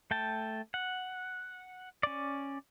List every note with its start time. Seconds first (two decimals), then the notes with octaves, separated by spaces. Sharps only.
0.11 A3 G5 A5
0.74 F#5
2.03 C#4 D5